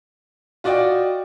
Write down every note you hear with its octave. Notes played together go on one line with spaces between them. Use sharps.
F4 F#4 D5 D#5 G5